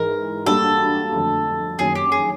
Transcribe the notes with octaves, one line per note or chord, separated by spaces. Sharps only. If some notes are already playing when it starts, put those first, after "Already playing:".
Already playing: G#2 E3 G#3 A#4
G3 A#3 D4 F#4 A4
F2 D3 F#3 A3
F#2 D#3 F#3 A#3 G#4
G4
G#4